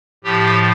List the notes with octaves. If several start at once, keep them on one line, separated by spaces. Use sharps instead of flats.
A2 F3 G4